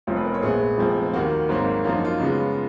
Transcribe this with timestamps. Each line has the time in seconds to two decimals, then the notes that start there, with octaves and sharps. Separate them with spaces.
0.07 F1 F2 F3 B3 C#5
0.16 B4
0.25 A#4
0.34 C#5
0.43 A#1 A#2 G#3 B3 G#4
0.78 F1 F2 F3 G#3 B3
1.13 D#2 D#3 A#3 F#4
1.49 G#1 G#2 D#3 F#3 A#3
1.84 F#2 F3 A#3 F4
1.95 D#4
2.05 F4
2.20 C#2 C#3 G#3 B3